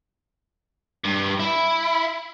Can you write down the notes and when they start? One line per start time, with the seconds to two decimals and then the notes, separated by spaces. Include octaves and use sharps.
1.04 G2
1.40 E4